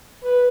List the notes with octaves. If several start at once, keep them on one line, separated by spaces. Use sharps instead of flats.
B4